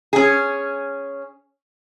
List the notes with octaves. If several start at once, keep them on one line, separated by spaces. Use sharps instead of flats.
C#4 G#4